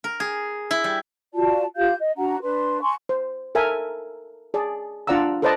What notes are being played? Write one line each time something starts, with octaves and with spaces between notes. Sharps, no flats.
A#4
G#4
E4
G3
F4 F#4 D5 A5
F4 G4 F5 G6
D#5
D4 F#4 F#5 A#5
D4 B4 C6
G#5 C6 C#6
C5
A4 A#4 E5 G#5
G#4 D5 A5
D4 F4 D5 F#5 A#5 E6
A4 B4 C5 D5 D#5 A5